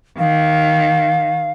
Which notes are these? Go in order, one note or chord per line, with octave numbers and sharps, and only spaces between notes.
D#3 F5